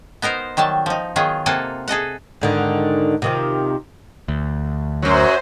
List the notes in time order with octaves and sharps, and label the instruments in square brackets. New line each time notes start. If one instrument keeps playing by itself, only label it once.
[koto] B3 D#4 A#4 C5
D#3 F#3 G3 A5
F3 D#4
D#3 F#3 B3 F4 G#4
C3 A#3 F4 A4 F#5 G#5
G#4 A4 D#5 F#5
[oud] G#2 D3 D#3
C3 D#3 F3
[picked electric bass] D2
[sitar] F#2 F#3 [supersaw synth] C5